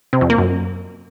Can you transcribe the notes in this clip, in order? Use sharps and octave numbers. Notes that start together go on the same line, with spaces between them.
C3
F2
A#3
F#2